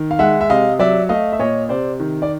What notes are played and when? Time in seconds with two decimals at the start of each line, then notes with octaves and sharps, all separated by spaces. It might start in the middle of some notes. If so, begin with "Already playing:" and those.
Already playing: D#3
0.11 F5
0.19 G#3 E5 F#5
0.41 E5
0.50 C3 D#5 F5
0.79 F#3 D5 E5
1.09 A3 D#5 F5
1.33 E5
1.39 A#2 C#5 D#5
1.69 C3 C5 D5
2.00 D#3
2.22 D5